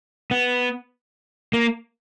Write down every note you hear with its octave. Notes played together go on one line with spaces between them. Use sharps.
B3
A#3